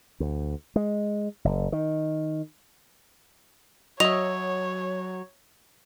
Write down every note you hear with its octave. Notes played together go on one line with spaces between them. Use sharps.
D2
G#3
F#1
D#3
F#3 C#5 D#5 E5 F7